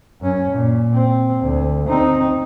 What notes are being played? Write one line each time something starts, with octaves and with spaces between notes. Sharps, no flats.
F#2 C#4
A#2
C4
D2
C4 D#4